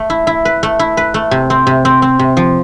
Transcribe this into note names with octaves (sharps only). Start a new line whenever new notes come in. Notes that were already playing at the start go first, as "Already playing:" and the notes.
Already playing: A3
E4
E4
B4
A3
E4
B4
A3
C3
C4
C3
C4
C4
C3
F3